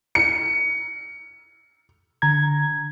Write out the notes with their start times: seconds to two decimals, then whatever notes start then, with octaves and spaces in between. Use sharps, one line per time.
0.15 C#7
2.22 D3 A#5 G#6